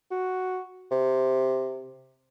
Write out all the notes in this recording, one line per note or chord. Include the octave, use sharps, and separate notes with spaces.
F#4
C3